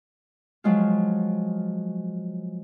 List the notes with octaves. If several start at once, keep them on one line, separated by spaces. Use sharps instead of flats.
F3 F#3 G#3 F4